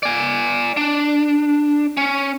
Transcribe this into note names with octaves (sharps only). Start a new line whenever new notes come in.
D5 G#5
D4
C#4